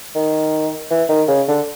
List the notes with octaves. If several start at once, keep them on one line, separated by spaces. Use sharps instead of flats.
D#3
E3
D#3
C#3
D3